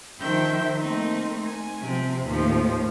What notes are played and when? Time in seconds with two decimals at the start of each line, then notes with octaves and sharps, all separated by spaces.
0.20 D#3 F3 C5 E5 G5 G6
0.79 A3 A#3 C4 D#4
1.44 G#5
1.82 C3 F3 C4
2.25 D#2 A2 F3